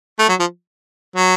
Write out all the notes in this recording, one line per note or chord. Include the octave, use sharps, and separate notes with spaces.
A3
F#3
F3
F#3